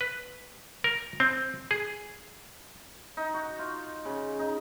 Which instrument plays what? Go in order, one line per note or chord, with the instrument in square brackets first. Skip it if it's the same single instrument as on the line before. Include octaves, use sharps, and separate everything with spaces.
[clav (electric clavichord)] B4
A#4
C4
G#4
[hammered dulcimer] D#4
F#4
F4
C#3
D#4